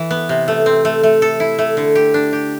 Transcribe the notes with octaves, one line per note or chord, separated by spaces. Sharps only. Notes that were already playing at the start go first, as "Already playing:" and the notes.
Already playing: E3
B3
C3
A3
C4
A3
A3
A4
E4
A3
D3
G4
D4
G4